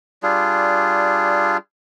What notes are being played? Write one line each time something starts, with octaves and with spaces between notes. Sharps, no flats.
G3 D4 F4 G#4